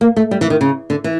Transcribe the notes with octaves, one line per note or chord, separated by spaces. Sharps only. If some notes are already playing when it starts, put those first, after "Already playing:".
A#3
A3
G3
E3
D#3
C#3
D3
E3